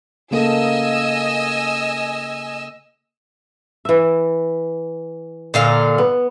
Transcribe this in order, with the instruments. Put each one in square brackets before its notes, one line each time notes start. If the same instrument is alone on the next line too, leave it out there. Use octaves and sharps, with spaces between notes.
[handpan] C#3 A#3 A4 [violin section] D#5 G#5 E6
[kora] E3 E5
[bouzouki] A#2 D3 F5
[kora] B3